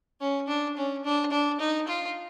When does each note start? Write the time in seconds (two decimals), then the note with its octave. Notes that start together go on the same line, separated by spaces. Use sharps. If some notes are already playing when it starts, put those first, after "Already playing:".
0.20 C#4
0.48 D4
0.77 C#4
1.05 D4
1.32 D4
1.60 D#4
1.88 F4